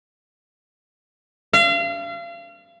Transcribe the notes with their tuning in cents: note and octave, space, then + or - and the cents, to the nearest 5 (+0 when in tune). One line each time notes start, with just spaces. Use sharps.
F5 -35